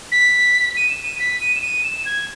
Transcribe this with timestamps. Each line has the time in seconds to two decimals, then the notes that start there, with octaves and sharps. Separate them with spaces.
0.12 B6
0.77 D#7
0.89 E7
1.03 D#7
1.19 B6
1.41 D#7
1.55 E7
1.62 D#7
1.84 E7
2.06 G#6